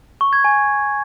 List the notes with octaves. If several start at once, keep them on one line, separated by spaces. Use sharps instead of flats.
C#6
G#6
G#5